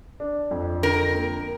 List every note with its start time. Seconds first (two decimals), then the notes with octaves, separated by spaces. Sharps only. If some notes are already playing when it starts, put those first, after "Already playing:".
0.20 D4
0.51 F2
0.83 D3 A#4
1.15 A#3